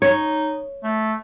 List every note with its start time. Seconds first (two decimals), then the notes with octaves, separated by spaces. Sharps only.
0.02 D#4 C#5
0.84 A3